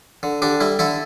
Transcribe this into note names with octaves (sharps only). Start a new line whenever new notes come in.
D3
D3 D4 G4
G3 E4
D3 E4 A4